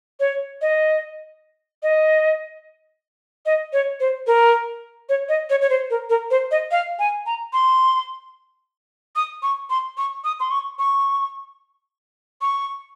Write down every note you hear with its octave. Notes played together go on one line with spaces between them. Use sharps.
C#5
D#5
D#5
D#5
C#5
C5
A#4
C#5
D#5
C#5
C#5
C5
A#4
A#4
C5
D#5
F5
G#5
A#5
C6
D#6
C#6
C6
C#6
D#6
C6
C#6
C#6
C#6